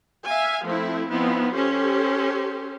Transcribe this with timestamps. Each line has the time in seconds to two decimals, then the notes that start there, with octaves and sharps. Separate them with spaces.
0.25 E5 F5 G#5
0.65 F3 A3 C4 E4
1.10 F3 B3 C4 D#4 E4
1.54 C#4 G4 A4 C5